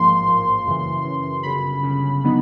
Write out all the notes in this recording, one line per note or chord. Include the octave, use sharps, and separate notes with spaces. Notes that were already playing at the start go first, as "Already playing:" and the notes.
Already playing: A1 G#2 F3 A#3 C6
A1 G#2 F3 A#3
F#2 C#3 E3
F#2 C#3 E3
G1 F#2 C#3 B5
G1 F#2 C#3
D3 F#3 B3 D#4